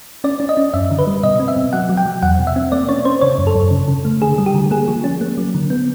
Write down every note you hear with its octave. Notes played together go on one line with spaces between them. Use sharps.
C#4 D5
C#4
D#5
C#4
F#2 E5
D3
B4
G3
B2 D#5
C4
E5
B2
F#3 F#5
F#3
G5
F#3
E2 F#5
B2
E5
C4
A#3 D5
C#4 C#5
C#4 C5
C#3 C#5
F#2
A4
F#2
C#3
C#3
A3
D3 G#4
G3
G4
D3
A#3 G#4
F3
C#4
A#3
F#3
D3
B3